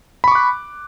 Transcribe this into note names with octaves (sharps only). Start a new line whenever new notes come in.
B5 C#6 D6 F#6